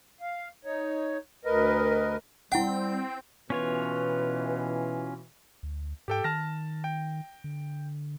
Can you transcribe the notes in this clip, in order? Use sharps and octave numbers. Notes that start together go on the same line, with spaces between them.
F5
D#4 C#5
D2 A#4 B4 D#5
G3 C4 E4 F#5 G5
B2 E3 C#4 F4 B4 C#5
D2
G#2 G4 A4 G5
D#3 A5 F6 A#6
G5
D3